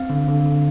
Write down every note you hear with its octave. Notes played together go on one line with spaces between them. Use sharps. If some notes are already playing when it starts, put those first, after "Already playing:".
Already playing: C4 F5
D3
D3
D3